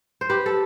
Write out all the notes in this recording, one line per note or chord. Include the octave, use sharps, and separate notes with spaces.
C5
G4 B4
A4